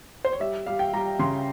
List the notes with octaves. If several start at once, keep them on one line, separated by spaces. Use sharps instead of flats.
C5
C#5
G3 E5
G3 F5
G5
G3 A#5
C#3 C6